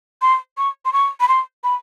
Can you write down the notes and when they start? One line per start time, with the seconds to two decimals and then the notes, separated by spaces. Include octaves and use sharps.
0.22 C6
0.58 C#6
0.85 C6
0.93 C#6
1.21 B5
1.28 C6
1.64 B5